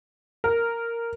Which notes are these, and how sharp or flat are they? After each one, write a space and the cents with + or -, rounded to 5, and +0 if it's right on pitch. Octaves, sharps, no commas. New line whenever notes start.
A#4 -5